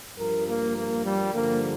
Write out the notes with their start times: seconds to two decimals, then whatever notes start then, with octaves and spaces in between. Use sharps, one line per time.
0.19 G2 F3 A#4
0.47 A#3
0.77 A#3
1.05 G3
1.32 G2 D3 F3 A#3